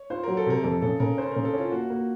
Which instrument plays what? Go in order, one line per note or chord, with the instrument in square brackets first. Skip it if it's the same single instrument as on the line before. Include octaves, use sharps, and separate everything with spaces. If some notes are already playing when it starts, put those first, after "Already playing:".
Already playing: [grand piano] C#5
[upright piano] F4 [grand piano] C5
[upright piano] F#3 [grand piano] A#4
[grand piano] A4
[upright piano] C3 [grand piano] A#4
[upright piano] F2 [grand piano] A4
[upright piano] C#3 [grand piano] A4
[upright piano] C#3 [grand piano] A#4
[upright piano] C#4 [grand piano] C5
[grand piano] A#4
[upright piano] C#3
[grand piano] A4
[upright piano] C#4
[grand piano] F4
[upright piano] A#3 [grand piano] F#4
[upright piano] A#3